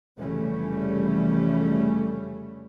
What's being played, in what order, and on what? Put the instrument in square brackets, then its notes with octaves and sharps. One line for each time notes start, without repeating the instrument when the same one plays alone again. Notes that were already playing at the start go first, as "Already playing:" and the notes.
[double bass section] F1 C#3 E3 G3 A3 C#4